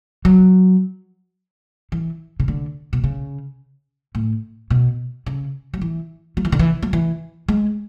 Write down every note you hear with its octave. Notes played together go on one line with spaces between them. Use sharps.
F#3
E3
C#3
D3
B2
C#3
A2
B2
C#3
F#3
E3
F#3
E3
D3
E3
F#3
E3
G#3